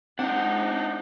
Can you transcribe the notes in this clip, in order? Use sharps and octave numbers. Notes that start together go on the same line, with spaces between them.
G#3 C4 D4 D#4 F#5